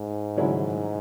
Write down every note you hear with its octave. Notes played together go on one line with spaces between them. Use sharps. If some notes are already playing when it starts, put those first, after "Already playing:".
Already playing: G#2
C#3 F#3 C#4 E4